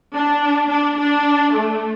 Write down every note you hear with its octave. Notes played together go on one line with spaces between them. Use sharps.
D4
D4
D4
A3